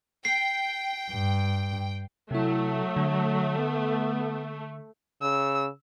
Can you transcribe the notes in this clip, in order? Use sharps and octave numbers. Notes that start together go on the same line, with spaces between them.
G5 C7
G2
C3 F#3 A3 E4
D3
B3
C#3 E6